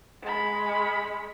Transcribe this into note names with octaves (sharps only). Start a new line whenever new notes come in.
G#3 B5